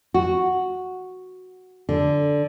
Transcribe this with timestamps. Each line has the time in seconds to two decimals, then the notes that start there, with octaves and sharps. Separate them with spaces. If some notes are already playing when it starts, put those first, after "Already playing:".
0.14 F#4
1.89 D3